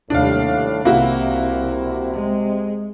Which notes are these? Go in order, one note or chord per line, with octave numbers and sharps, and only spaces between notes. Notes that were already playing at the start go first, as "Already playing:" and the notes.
D#2 A2 C3 G3 D4 F5
C2 C3 A#3 E4 F#4
G#3